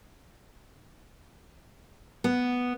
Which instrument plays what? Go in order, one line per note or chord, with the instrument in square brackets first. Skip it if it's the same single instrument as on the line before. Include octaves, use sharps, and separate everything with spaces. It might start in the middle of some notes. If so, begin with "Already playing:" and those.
[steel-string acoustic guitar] B3